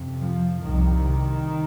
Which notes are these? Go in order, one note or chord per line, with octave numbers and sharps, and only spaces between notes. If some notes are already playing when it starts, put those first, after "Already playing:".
Already playing: F2 C3
F3
C2 C3 D#3